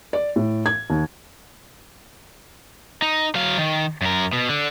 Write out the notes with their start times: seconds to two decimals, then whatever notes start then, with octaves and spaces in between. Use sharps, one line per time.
0.13 D5
0.36 A2
0.66 G#6
0.90 D#2
3.02 D#4
3.35 F#3 F5
3.58 D#3
4.02 F#2 A#4
4.33 B2
4.49 D3